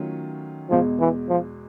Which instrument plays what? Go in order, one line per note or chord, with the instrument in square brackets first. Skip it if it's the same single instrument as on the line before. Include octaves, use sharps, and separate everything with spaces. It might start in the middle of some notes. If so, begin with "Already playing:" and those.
Already playing: [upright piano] D#3 F#3 A3 C#4 F4
[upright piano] E2 B2 G#3 [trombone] F3
[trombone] E3
F3